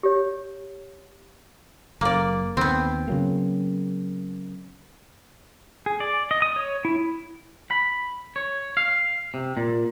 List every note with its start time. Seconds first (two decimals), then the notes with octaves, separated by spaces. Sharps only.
0.03 G4 C#5
2.01 F#1 A#3 D5
2.57 D#2 B3 C4
3.08 C#3 F#3 A#3
5.86 G#4
6.00 D5
6.31 D#5
6.42 D#6
6.56 C#5
6.85 E4
7.71 B5
8.36 C#5
8.77 F5
9.34 C3
9.57 A#2